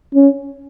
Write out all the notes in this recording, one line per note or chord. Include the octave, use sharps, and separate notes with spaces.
C#4